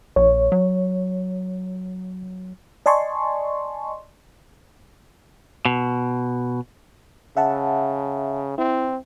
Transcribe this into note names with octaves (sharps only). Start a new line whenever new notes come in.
A#1 C#5
F#3
D5 D#5 G#5 A5 C6 C#6
B2
C#3 E5 F#5 A5
C4 E4